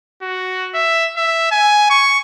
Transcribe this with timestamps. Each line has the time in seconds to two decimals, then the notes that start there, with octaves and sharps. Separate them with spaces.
0.22 F#4
0.74 E5
1.17 E5
1.52 G#5
1.90 C#6